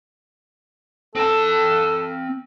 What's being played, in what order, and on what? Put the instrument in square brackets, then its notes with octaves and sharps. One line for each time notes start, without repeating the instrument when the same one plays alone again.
[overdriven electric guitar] C4 A5 [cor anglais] A4